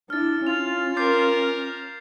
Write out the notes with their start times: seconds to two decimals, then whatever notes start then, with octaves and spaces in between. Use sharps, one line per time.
0.10 D4 E4 F6 A6
0.47 C#4 F4 F7
0.97 A#4 D6 G6 C7